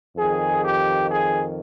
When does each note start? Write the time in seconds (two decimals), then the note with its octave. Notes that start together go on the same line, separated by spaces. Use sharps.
0.17 F2 D#3 G#4
0.63 G4
1.09 G#4